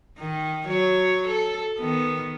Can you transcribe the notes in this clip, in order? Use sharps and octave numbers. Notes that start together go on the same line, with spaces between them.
D#3
F#3 C#5
A4
D#3 B3